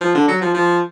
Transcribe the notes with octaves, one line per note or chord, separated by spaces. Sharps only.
F3
D3
F#3
F3
F3